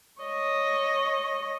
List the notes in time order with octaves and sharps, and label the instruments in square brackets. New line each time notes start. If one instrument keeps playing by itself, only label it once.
[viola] C#5 D#5